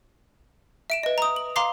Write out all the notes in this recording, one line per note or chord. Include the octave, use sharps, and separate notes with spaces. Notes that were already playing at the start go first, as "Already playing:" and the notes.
E5 D7 E7
B4 D#5
A#5 D#6
F#7
F5 A#5 C6 D6 C7